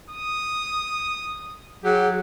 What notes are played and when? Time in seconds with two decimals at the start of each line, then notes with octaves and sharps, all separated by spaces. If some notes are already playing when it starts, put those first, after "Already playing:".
0.10 D#6
1.84 F#3 G4 G#4